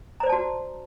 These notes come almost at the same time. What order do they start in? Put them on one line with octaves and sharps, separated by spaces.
A#5 C5 D5 A5 F#4